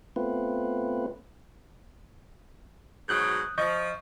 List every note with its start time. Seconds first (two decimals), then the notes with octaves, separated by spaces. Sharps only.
0.16 A3 B3 C4 F4 B4
3.09 G#2 B2 F#3 D#6 F#6 G6
3.58 F3 D#5 C#6 G6